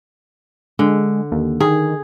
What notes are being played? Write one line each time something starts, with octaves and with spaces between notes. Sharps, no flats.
D3 G#3
D#2
D#3 G#4